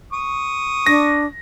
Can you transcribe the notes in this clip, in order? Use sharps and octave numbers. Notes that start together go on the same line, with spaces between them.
C#6 D#6
D4 A#6